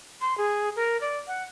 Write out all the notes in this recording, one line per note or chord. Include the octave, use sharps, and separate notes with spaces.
C6
G#4
A#4
D5
F#5